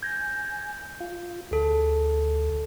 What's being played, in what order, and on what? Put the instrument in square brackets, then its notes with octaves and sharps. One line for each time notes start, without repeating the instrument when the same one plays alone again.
[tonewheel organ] G#5 [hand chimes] G6 A#6
[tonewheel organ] F4
[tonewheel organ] D2 [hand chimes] G#4 A4